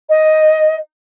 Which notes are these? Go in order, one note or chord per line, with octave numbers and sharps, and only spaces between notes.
D#5